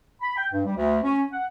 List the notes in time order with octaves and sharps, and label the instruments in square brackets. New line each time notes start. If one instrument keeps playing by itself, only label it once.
[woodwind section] B5
G5
G2
G3
D2
C#4
F#5